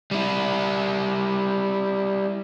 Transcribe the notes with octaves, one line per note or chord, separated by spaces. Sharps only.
G3 E4